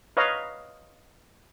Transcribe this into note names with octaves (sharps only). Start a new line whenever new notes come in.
B4 C#5 D#5 F5 A#5